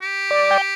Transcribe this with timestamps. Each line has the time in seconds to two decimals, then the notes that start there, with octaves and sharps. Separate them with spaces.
0.02 G4
0.31 D5
0.51 G5